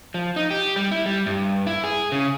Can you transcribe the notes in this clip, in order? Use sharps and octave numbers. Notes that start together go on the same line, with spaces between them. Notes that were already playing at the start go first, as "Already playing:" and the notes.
F3
D#4
G4
G3
E4
G3
G2
E4
G#4
C#3